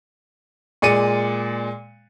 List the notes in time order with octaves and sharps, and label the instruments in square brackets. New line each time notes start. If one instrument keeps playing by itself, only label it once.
[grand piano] A#2 G#3 D5 C#7 D#7